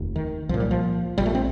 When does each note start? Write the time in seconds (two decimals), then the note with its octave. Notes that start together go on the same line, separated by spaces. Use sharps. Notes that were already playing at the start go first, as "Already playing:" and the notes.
Already playing: F1 D#2
0.16 D#3
0.49 C2 A#2 F3
0.60 G3
0.71 F3
1.18 A#1 A#2 G3
1.26 A3
1.35 C4